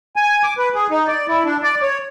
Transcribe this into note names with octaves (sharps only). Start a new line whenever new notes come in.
G#5
D6
B4
G#4
D#4
D5
E4
D4
D5
C#5